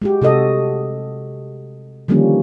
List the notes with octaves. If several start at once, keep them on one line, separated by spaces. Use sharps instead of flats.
G#3 F#4 G4
C3 F#4 A4 D#5
D3 D#3 F3 G3 A#3 C#4